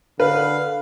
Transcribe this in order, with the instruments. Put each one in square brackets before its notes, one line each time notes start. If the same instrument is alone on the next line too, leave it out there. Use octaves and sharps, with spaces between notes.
[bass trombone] D3 [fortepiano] B4 [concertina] F5